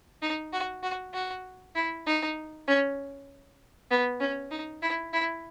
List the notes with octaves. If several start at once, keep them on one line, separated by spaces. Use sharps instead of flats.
D#4
F#4
F#4
F#4
E4
D#4
C#4
B3
C#4
D#4
E4
E4